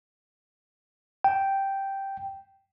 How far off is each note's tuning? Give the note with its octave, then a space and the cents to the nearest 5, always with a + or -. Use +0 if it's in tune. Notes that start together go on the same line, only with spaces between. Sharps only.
G5 -5